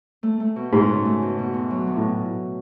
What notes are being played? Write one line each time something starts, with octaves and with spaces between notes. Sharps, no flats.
A3
A3
B2
G#2 A3
C#3
A3
B2
B2
E2
F#3
D2
A2